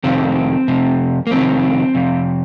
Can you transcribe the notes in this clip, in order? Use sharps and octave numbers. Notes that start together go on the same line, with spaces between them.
F2 C3 D#3 C4
F2 C3
A#3
F2 C3 D#3 C4
F2 C3